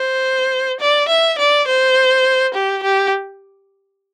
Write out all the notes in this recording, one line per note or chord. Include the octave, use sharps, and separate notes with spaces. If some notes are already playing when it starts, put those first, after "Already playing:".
Already playing: C5
D5
E5
D5
C5
G4
G4